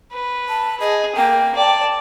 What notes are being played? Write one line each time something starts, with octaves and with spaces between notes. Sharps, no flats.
B4
A5
G#4 D#5
A#3 G5
D5 A5